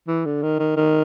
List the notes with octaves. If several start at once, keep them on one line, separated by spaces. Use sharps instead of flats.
E3
D3
D#3
D#3
D#3